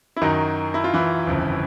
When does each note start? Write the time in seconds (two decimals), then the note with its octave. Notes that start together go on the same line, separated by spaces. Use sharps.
0.17 E4
0.21 F#2 D#3 F#3 D#4
0.74 E4
0.84 F4
0.94 E3 E4
1.27 G1 F2 C#3